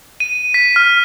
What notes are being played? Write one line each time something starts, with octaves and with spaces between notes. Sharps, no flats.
D#7
B6
F6